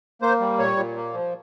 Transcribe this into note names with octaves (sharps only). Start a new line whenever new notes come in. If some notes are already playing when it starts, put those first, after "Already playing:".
A#3 C5
G3
A#2 C#5
A#2
A#3
F3